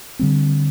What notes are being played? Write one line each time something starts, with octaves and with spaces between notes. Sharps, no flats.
D3 G3 C4